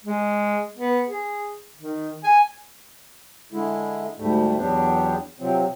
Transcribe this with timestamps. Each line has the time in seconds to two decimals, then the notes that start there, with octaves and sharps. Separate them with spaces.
0.04 G#3
0.77 B3
1.08 G#4
1.76 D#3
2.24 G#5
3.52 D3 G#3 E4
4.18 D2 G#2 G3 A3
4.57 E2 F#3 B3 D4 G4
5.40 C3 F3 F#3 C4